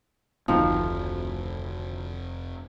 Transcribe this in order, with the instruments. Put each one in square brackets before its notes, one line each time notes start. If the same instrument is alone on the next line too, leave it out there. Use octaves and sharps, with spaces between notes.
[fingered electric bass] F1 [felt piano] D2 [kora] D#3 F3